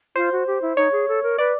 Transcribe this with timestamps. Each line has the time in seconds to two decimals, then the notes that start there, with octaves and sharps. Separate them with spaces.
0.16 F4 C5
0.32 F#4
0.47 G4
0.62 E4
0.77 D#4 C#5
0.92 G#4
1.08 A4
1.23 A#4
1.38 B4 D5